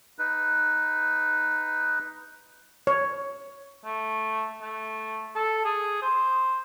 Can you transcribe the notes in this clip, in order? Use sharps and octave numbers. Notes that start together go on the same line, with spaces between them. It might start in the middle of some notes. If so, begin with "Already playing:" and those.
D#4 B4
C#5
A3
A3
A4
G#4
C5